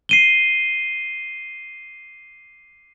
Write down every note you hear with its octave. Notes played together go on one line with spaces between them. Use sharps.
C7 D#7 G7